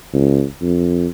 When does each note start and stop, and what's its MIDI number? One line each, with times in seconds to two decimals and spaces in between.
0.13 0.44 37
0.62 1.07 41